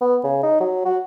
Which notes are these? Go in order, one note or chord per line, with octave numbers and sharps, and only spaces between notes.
B3
C#3
D#4
F#3
F#4